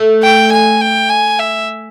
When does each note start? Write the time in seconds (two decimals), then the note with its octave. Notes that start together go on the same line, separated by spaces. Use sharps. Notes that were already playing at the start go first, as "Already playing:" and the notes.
Already playing: A3
0.23 G5
0.52 G#5
0.81 G5
1.10 G#5
1.39 E5